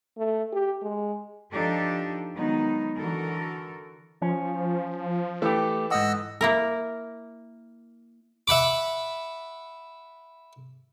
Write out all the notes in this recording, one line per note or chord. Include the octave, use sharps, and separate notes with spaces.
A3
G4
G#3
F3 D4 D#4 G4 A4
D#3 F#3 G#3 B3 D#4
D3 E3 F#4 A4 A#4
F3 C#4
E3 A3 G4 A4
G#2 D#5 F#5 E6
A#3 E4 A#4
E5 F#5 B5 D6